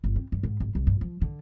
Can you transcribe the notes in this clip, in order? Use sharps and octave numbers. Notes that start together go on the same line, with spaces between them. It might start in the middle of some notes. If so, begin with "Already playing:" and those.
G1
C4
G2
G#2
G#1
C2
G2
F3
D3